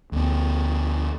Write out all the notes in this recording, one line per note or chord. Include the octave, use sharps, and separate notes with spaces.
D2 B3